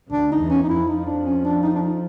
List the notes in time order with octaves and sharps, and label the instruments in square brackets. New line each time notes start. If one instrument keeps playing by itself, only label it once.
[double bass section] D2 D3 [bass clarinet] D4
[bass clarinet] D#4
[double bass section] E2 E3
[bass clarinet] C#4
D#4
[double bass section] F2 F3 [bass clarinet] E4
[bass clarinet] D#4
D4
C#4
D4
D#4
D4
D#4